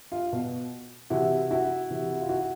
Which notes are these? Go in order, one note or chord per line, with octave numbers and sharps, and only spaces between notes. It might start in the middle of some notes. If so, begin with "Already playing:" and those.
F4
B2
C3 E3 E4 F#4
E4 F#4
C3 E3
F4
E4 F#4